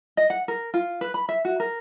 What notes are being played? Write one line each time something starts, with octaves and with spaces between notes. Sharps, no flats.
D#5
F#5
A#4
F4
B4
B5
E5
F#4
A#4